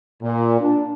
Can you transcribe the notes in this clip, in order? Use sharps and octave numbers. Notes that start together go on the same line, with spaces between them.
A#2
D4